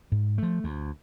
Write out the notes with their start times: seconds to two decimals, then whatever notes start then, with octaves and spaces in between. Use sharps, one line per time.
0.12 G#2
0.38 F3 A3
0.64 D2